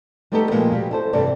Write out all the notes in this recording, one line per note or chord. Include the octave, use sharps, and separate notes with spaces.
G3 A3 B3 D#4 G4 A4
A#2 F3 G#3 A#3 F4 G4
B2 G3 G4
E4 A4 C5
G2 C3 E3 G3 A4 D5